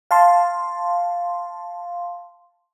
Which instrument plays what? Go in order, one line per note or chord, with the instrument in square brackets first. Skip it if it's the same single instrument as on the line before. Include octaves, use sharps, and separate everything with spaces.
[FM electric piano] F5 A5 C6